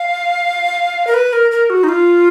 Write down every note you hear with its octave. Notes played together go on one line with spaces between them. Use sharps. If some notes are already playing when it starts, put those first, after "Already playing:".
Already playing: F5
A#4
B4
A#4
A#4
F#4
D#4
F4